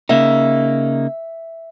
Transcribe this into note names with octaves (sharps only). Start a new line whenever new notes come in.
C#3 A#3 D#4 E5